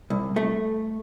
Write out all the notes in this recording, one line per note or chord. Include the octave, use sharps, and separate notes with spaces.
C2
A3